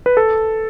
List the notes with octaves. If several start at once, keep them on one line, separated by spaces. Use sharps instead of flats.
B4
A4